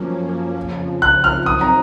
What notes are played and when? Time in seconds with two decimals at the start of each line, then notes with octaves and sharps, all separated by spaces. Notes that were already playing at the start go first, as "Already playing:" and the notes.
Already playing: F#2 F3 A#3 C#4
0.57 F2 C#3 F3
1.02 F#6
1.24 F6
1.46 F#3 C4 D#4 D#6
1.61 A#5